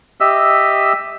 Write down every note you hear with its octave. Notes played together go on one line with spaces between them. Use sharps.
G4 D#5 E5 E6